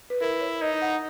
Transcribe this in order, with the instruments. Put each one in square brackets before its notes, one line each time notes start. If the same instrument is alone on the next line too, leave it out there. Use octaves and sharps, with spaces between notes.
[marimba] B4
[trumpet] E4 [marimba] A#4
[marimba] C#5
[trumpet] D#4 [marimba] D#5
[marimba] F#5